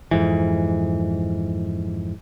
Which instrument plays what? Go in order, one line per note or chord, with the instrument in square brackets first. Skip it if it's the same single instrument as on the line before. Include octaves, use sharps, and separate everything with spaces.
[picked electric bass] F2 G#2 E3